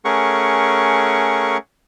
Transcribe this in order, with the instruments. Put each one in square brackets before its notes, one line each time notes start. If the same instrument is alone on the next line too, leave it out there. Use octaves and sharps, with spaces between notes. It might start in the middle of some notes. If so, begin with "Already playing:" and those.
[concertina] A3 C#4 G#4 A#4 F#5 C#6